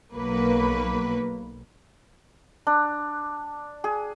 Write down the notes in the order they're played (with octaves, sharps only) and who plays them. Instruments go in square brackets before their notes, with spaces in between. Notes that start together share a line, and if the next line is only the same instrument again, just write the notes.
[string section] B1 F#3 A#3 B4
[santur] D4
G#4